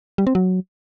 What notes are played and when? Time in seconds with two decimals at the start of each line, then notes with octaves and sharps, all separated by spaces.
0.18 G3
0.27 C4
0.35 F#3